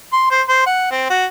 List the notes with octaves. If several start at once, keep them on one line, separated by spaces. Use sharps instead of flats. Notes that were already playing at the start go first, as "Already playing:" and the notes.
C6
C5
C5
F#5
C4
F#4